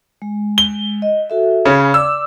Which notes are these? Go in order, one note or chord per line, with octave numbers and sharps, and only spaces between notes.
G#3
G7
D#5
F#4 A4 E5
C#3 C#4 G#5 B5
D5 D6 E6